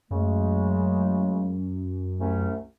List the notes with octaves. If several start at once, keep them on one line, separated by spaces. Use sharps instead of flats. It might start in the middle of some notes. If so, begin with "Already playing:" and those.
F#2 C#3 G#3 A3
C2 A3 C#4